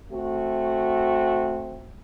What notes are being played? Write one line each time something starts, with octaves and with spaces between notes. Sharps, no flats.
A3 C4 F#4